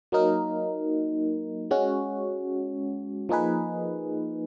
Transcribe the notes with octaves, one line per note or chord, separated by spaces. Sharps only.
F#3 A#3 D#4 A#4
G#3 C#4 F#4
F3 A#3 D#4 G#4 B4